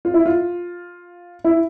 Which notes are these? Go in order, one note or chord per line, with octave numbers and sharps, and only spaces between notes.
F4
E4
F4
E4